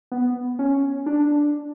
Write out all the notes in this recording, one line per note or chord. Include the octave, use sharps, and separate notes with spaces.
B3
C#4
D4